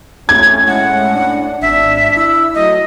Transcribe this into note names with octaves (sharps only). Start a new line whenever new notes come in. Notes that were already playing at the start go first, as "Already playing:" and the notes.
A2 C#4 G#6
G#3 F#5
D4
G#1 D4 E5
E4 E6
F#3 A3 D#5